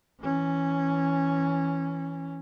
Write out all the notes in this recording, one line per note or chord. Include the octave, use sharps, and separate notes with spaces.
E3 C#4